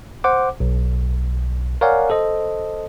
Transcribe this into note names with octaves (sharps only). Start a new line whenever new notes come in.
C5 F#5 D6
B1
A#4 C#5 D5 F5 F#5 G#5
A4 C5 D#5